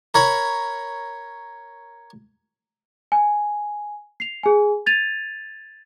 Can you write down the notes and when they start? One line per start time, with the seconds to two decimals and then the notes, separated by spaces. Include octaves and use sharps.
0.14 A#4 C#5 B5
3.12 G#5
4.20 C7 F7
4.43 G#4 G#5
4.86 G#6 A6 D#7 F7